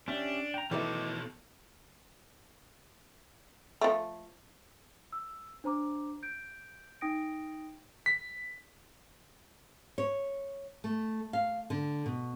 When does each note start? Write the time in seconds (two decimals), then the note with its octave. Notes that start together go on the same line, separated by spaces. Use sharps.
0.08 C#4 D4 G4 E5
0.54 G5 A#5
0.71 B2 D#3 E3 A3 A4 D#5 D6
3.81 F3 A3
5.13 E6
5.64 D4 C5 A#5 D6
6.23 G6 D7
7.01 D#4 G5 D#6 A#6 D7
8.06 B6
9.98 C#5
10.84 A3
11.33 F5
11.70 D3
12.06 B2